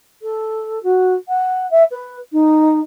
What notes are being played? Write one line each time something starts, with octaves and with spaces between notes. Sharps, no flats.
A4
F#4
F#5
E5
B4
D#4